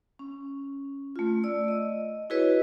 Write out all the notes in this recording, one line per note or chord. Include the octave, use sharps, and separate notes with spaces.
C#4
A3 F4
D5 E6
D#5
E4 F#4 G#4 B4 C#5 D#5